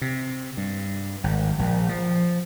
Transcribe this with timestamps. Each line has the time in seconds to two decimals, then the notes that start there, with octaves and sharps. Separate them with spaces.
0.02 C3
0.57 G2
1.24 G#1
1.59 A#1
1.89 F3